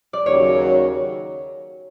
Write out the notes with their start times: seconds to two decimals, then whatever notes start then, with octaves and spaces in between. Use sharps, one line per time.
0.13 D5
0.26 D#2 C#3 F#3 C#5